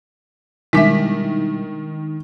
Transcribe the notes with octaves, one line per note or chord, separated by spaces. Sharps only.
B2 D#3 G3 G#3 D4 E4 E5 B6